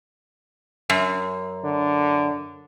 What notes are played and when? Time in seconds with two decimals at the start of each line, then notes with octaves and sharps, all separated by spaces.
0.90 F#2
1.64 D3